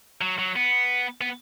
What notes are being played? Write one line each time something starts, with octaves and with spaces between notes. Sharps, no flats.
F#3
F#3
B3
B3